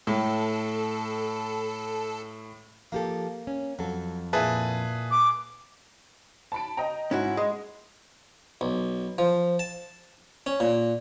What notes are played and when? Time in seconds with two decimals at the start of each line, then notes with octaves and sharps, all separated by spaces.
0.07 A2 A4
2.92 F3 A#3 G4 A4
3.47 C#4
3.79 F2 F#3 A4
4.33 A#2 E4 G#4 B4 A5
5.11 D6
6.52 A5 B5 D7
6.77 D#5 G5 A#5
7.11 G#2 C#4 E4 F#4
7.37 G#3 D#5
8.61 B1
9.18 F3
9.59 A5
10.46 C#4
10.60 A#2